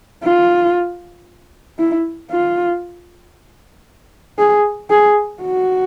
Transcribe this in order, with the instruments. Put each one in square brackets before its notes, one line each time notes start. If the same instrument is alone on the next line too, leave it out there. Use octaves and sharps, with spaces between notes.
[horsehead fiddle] F4
E4
F4
G#4
G#4
F#4